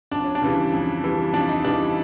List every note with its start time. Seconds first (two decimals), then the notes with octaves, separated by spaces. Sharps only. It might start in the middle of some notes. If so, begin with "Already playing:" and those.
0.12 F2 D4
0.24 C#4
0.35 D4
0.42 C#3 E3 G3
0.74 F2
1.03 C#3 E3 G3
1.33 F2 D4
1.49 D#4
1.64 C#3 E3 G3 D4